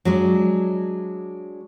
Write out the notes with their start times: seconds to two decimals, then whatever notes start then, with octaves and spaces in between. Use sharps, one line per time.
0.05 F#3 G#3 D4